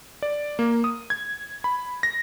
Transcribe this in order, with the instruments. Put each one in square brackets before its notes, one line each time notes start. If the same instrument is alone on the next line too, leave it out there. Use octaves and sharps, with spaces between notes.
[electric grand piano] D5
A#3
D#6
G#6
B5
A#6